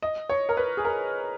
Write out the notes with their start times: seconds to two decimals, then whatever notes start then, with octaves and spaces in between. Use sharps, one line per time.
0.02 D#5
0.29 C#5
0.49 A#4
0.57 B4
0.77 G#4
0.85 A#4